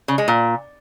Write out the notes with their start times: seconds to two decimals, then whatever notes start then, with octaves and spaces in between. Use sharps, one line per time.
0.08 C#3
0.18 G#3
0.28 A#2